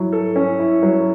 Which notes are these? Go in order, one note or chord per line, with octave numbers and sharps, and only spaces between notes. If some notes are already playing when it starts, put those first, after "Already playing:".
Already playing: F#3 E4
A4
C#4
E4
F#3